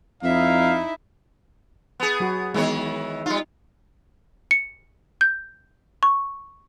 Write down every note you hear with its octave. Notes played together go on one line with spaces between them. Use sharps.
F2 D#4 E4 E5 F5
B3 G#4
F#3 F#4
D#3 E3 G#3 B3 C#5
G3 D#4 F4
C#7
G6
C#6